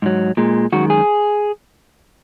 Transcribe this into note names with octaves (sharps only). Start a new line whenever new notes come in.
G#2 F#3
A#2 G#3
F#2 D#3 G#3 F#4
G#4